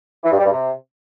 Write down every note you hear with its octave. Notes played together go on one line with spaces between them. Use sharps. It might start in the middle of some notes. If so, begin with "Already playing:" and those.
E3
G2
G3
G2
C3